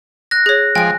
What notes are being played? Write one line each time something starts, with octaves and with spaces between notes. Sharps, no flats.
F#6 A#6
G#4 C#5
F3 G#3 G5 D7